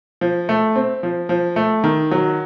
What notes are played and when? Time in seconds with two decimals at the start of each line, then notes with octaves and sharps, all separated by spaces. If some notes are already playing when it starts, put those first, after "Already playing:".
0.21 F3
0.49 A3
0.76 C4
1.03 F3
1.29 F3
1.56 A3
1.84 D#3
2.11 F#3